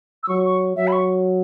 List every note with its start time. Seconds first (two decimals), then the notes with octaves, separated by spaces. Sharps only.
0.23 E6
0.29 F#3 C#6
0.45 C#6
0.76 F#3 E5
0.87 B5
0.92 C#6